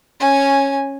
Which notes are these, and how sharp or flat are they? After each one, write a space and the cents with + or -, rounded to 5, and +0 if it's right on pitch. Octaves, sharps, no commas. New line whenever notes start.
C#4 -10 G#5 +0